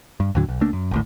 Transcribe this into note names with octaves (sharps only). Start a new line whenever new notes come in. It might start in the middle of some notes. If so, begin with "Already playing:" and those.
G2
D#2 A2 D3 F#3
B1
C#2 A3 A#3 D4
F#2
G#1 D2 A2